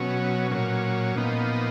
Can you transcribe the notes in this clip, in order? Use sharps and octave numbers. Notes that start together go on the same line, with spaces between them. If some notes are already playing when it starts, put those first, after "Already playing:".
Already playing: B2 F#3 C#4
A#2 F#3 C#4
A#2 F3 B3 D#4